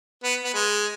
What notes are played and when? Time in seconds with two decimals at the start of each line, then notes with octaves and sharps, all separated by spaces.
0.24 B3
0.44 B3
0.55 G#3